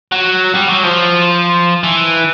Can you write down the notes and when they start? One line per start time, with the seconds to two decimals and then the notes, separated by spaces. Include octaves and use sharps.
0.12 F#3
0.54 G3
0.69 F#3
0.83 F3
1.84 E3